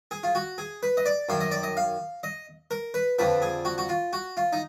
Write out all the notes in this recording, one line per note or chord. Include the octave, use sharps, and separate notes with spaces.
G#4
F4
F#4
G#4
B4
D#5
D5
F#2 D#3 F5
D#5
D5
D#5
F5
D#5
A#4
B4
F2 D3 F3 B4
G#4
F#4
F#4
F4
F#4
F4
D#4